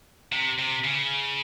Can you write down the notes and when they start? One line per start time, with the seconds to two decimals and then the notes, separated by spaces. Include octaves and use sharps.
0.33 C3
0.59 C3
0.84 C#3